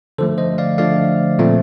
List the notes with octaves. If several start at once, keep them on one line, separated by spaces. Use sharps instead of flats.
D3 F3 A3 A4 C5
C5 D#5
D5 F5
D3 F3 A3 D5 F5
A#2 F3 A3 C4